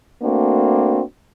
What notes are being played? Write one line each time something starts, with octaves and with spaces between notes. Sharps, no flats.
A3 A#3 C4 D4 F#4